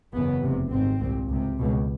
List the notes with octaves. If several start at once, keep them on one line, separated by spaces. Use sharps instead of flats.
F#1 E2 C#3 B3
F1 E2 C3
G#1 G#2 C4
C2 A#2
C#2 C3
C#2 B2